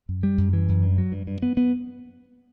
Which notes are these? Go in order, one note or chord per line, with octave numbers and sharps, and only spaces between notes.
F#2
G3
F#2
E3
F#2
G2
F#3
G2
G2
B3
B3